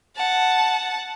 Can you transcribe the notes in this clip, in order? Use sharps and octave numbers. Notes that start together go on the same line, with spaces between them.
F#5 A5